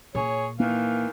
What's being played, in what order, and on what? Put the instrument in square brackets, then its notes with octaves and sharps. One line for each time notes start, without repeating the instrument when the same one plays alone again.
[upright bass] A#2 [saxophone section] G#4 C#5
[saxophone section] D#3 E3 F5 [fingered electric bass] A#3